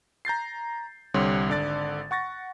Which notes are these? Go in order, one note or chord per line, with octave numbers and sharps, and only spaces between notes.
A#5 G6 A6 C7
C2 D3 G3 C4 C#5 C6
G#1 D3 D5 A6
F#5 C#6 A6 A#6